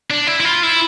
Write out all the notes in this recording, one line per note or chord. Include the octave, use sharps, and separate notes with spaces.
D4
E4
E4
F4
E4